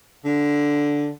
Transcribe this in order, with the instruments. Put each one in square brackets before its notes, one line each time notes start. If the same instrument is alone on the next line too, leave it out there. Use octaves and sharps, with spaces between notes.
[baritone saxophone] D3